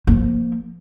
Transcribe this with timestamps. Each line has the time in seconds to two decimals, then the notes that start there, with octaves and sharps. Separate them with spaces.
0.07 F3 A#3